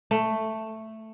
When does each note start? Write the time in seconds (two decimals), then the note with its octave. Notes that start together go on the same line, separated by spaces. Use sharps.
0.11 A3